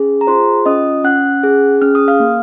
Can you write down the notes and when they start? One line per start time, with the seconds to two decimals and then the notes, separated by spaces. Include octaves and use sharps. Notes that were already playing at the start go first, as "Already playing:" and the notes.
Already playing: C#4 G#4
0.21 A#5
0.27 F4 C5 C6
0.66 C#4 D#5 D#6
1.04 C#4 F#5 F#6
1.43 G#4
1.82 C#4 F6
1.95 D#6
2.08 F5 F6
2.20 A#3